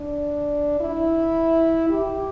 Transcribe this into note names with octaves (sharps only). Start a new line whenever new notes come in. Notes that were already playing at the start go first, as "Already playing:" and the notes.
Already playing: D4
E4
G4